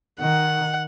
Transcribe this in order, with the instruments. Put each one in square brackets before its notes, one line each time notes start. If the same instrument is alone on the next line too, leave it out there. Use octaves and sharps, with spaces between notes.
[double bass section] D#3 [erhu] F#5